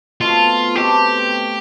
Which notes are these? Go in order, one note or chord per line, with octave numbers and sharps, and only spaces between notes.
B2 A3 C4 F4
B2 A3 C4 G4